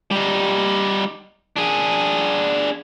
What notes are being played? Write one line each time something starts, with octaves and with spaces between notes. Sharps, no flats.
G3 D#4
D4 G#4